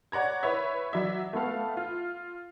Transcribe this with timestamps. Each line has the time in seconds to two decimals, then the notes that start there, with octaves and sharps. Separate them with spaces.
0.12 C#5 D5 F#5 A#5 G#6
0.43 E4 B4 C#5 E5
0.93 F#3 D5 E5
1.33 A3 B3 A4 F5
1.77 F4